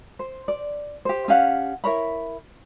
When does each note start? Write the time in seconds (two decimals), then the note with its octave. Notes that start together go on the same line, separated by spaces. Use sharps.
0.19 C5
0.48 D5
1.05 G4 C5
1.28 C#4 G4 F5 F#5
1.84 E4 A#4 C#5 B5